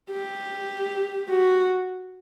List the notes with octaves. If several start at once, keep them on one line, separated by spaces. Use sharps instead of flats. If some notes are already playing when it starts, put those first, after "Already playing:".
G4
F#4